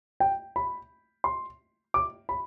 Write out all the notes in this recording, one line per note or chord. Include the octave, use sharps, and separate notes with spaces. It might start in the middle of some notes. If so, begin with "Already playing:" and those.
G5
B5
C6
D6
B5